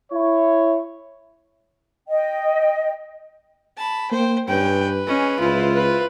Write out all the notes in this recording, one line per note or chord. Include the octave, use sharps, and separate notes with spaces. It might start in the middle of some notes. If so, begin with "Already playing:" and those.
E4 C#5
D#5 G5
A5 B5
A#3 C5 G5
G2 C#4 B4 G5
C#4 G#4 D#5
C#2 E4 F4 C5
B4